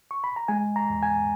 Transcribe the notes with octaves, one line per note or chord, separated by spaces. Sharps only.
C#6
B5
A#5
G#3 G#5
A#5
E2
G#5